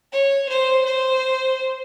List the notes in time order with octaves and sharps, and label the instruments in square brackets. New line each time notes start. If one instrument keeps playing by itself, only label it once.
[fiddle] C#5
C5
C5